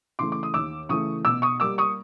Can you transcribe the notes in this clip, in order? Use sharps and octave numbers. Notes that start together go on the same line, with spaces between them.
C#3 E3 A3 C6 D6
D6
D#6
D#2 D6 E6
C#3 E3 A3 C#6 D#6
B2 D6 E6
C#6 D#6
G3 A#3 D6 E6
C#6 D#6